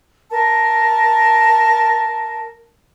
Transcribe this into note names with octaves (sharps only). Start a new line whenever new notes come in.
A#4 A5